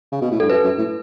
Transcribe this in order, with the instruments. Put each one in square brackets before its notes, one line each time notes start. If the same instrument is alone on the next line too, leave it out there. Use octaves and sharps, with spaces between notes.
[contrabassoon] C#3
B2
A2
[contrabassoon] G2 [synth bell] A4
[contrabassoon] F#2 [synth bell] B4
[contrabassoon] F#2
A2